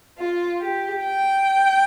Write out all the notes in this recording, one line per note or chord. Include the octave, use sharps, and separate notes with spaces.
F4
G4
G5